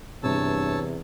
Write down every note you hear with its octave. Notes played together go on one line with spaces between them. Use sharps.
E2 G2 C3 C#5 A5 E6